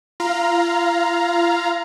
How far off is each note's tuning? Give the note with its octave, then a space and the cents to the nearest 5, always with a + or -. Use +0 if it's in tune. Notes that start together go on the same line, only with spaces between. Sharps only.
F4 -35 F5 +0 A#5 +10